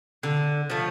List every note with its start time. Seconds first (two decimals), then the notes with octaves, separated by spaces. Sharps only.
0.23 D3
0.70 F3 A3